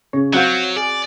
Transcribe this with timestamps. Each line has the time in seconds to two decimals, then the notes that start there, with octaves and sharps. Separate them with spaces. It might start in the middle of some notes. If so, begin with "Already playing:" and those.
0.13 C#3 C#5
0.33 F#3 C4 F#4 F5 F#6 G6
0.77 G#4 D5